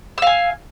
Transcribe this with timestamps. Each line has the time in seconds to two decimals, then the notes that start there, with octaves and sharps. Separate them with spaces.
0.18 E6
0.22 F5
0.27 G#5